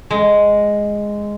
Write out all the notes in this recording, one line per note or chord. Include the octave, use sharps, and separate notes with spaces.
G#3